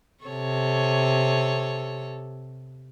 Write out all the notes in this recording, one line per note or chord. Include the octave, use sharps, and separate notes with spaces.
C3 A4 C#5